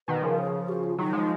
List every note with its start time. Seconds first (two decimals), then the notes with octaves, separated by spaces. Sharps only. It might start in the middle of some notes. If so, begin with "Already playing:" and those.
0.08 B2 D#3 B4
0.23 C#3 F3 A#4
0.38 G#4
0.68 F#4
0.83 F4
0.98 D#3 F#3 D#4
1.13 F3 G#3